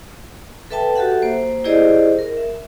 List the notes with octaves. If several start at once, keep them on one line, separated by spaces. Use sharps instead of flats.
A4 B4 E5 G5 A5
F#4 G4 A4 E5 F#5
A#3 C5
E4 G4 G#4 C5 D5 D#5
A#4
E5